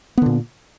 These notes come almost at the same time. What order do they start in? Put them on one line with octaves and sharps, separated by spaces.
B3 D3 A#2